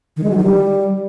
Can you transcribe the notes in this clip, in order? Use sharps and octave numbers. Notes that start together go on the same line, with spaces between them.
D#3
G#3
F#3
D#3
G3